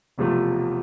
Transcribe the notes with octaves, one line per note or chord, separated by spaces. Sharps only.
E1 E2 C3 F3 A3